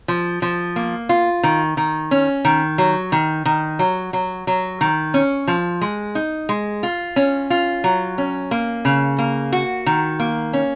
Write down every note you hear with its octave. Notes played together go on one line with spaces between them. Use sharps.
F3
F3
A#3
F4
D#3
D#3
C#4
D#3
F#3
D#3
D#3
F#3
F#3
F#3
D#3
C#4
F3
G#3
D#4
G#3
F4
C#4
F4
F#3
C#4
A#3
C#3
A#3
F#4
D#3
A#3
C#4